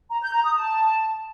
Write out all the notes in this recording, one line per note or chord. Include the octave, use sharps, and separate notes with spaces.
A#5
G6
A#5
D#6
A5